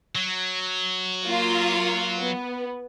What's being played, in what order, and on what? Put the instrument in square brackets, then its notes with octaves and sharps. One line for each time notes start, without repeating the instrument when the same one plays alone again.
[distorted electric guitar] F#3
[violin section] A#3 F4 F5
B3